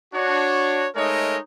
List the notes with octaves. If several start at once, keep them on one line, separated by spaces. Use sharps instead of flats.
D4 F#4 C#5
G#3 A3 D#4 A#4 C#5 D#5